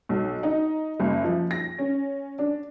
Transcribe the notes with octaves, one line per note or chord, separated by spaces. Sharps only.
B1
D#4
F#1
F3
A#6
C#4
D4